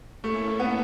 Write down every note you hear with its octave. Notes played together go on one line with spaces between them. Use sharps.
A3 A#3 C#4 E4 A4
B3